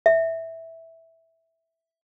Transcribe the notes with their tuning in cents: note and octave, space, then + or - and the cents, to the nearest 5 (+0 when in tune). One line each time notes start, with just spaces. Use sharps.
E5 -10